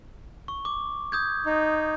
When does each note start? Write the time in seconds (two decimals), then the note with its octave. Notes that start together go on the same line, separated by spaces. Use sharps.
0.48 C#6
0.65 D6
1.12 D#6 G6 G#6
1.46 D#4